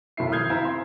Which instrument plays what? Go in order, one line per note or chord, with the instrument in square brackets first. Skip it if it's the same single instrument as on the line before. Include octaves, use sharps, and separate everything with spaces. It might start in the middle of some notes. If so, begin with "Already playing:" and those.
[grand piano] F1 B1 D#3 E4 E5 C7
D#6 F6 G6 G#6 C7
C4 E4 E5 F5 G#5 A#5
B5 C6